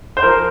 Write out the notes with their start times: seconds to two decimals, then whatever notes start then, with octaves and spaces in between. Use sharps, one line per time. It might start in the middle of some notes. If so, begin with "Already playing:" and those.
0.17 C5
0.23 F3 A#4